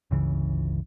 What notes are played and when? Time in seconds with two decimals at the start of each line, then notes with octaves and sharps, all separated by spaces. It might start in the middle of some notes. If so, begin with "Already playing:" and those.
0.11 G1 C#2 C#3 E3